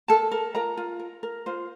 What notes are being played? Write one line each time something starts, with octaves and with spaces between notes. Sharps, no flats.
A4 A#4 A5
A#4
F4 A#4 A#5
F4
A#4
A#4
F4 C5